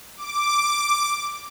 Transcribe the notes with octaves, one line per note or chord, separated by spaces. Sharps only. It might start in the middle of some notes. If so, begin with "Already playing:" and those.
D6